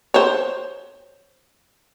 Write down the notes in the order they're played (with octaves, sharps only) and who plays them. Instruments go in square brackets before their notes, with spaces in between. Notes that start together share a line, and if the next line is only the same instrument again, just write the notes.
[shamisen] C5 C#5